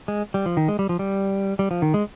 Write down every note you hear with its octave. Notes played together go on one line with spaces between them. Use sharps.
G#3
G3
F3
D#3
G#3
G3
F3
G3
G3
F3
D#3
G#3